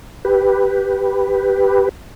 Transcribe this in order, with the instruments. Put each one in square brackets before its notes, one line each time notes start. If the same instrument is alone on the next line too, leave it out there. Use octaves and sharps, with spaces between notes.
[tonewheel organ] G4 B4